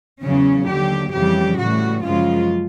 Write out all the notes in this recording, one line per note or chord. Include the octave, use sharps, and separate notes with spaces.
E2 C#3 F#3 C#4
D#2 D3 F#3 G4
F2 C#3 E3 G3 G4
A2 E3 G3 F#4
F#2 C#3 F3 G#3 F4